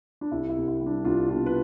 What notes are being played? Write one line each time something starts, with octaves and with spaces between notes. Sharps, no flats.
D4
C2 E4
E4
C2
E4
G3
D4
C2 D4 F4
B2 D4 F4
B4